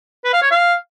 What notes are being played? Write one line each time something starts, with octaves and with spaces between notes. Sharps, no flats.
B4
F5
C#5
F5